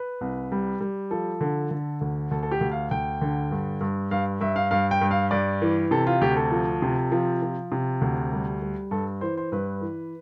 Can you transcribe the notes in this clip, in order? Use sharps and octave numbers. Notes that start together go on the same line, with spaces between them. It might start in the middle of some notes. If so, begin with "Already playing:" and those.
Already playing: B4
C2
G3
G3
F3 A4
D3
D3
D2
D2 A4
A4
G4
D2
F5
D2 G5
D3
G2
G2
G2 F5
G2 E5
F5
G2 F5
G5
G2
F5
G2 D5
E3
C3 A4
F4
D2 G4
A4
F3
C3
F3
F3
C3
D2
G3
G3
G2 A4
E3 C5
C5
G2 B4
E3